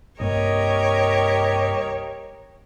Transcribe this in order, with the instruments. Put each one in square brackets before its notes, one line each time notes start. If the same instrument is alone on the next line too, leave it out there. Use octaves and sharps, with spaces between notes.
[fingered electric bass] C2 G2 A#3 [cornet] G4 [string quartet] A#4 C#5 [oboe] D#5